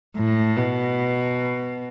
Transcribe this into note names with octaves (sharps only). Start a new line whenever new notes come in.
A2
B2